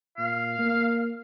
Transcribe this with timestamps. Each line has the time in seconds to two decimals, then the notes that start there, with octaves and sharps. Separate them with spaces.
0.18 A#2 F5
0.58 A#3